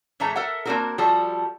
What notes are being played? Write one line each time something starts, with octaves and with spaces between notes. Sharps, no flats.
A2 E3 G#3 A3 A#5
A4 A#4 E5 F#5
A#3 C4 D4 E4 F#4 A#4
F3 G3 F#4 A4